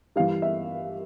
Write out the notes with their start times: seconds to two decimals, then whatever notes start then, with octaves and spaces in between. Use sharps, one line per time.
0.16 G2 E3 F5
0.42 E5